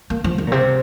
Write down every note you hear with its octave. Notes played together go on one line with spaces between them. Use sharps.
A#3
F3
D#3
A#2
C3